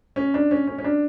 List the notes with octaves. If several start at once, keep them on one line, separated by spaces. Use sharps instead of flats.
C#4
D4
C#4
C#4
C#4
D4